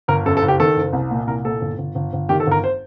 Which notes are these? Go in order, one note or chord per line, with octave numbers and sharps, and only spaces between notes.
G1 A#4
F#2 A4
A4
F#1
G4
D#3 A4
F#1
C2
A#2
C2 A#4
A#2 A4
G1
G1
G1
G1
D#3 G4
A4
G1 A#4
C5